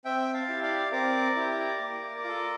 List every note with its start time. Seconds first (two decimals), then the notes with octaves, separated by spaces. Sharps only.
0.05 C4 E5 G5
0.34 F5 A5
0.49 E4 G4
0.63 D5 F5
0.92 C4 A#4 D5
1.36 E4 G4
1.79 A#3
2.24 F4 A4